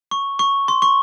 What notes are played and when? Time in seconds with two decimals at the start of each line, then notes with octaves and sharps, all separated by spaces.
0.11 C#6
0.39 C#6
0.68 C6
0.82 C#6